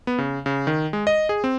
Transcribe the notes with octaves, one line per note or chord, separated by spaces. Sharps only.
B3
C#3
C#3
D#3
G#3
D#5
G#4
C4